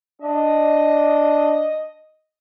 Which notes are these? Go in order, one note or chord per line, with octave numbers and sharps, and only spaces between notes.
D4 D#5